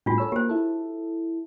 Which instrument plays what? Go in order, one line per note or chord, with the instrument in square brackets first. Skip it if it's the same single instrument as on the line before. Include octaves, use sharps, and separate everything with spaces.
[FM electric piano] A2 G3 [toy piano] D4 F4 F#4
[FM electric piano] A4 C#5 E6
[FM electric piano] A#3 [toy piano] G4 C5
[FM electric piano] E4 A4